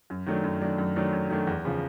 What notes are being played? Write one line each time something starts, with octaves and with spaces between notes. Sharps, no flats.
F#2
D#3 F#3 A3 D4
F#2
D#3 F#3 A3 D4
F#2
D#3 F#3 A3 D4
F#2
D#3 F#3 A3 D4
E2
C#3 F3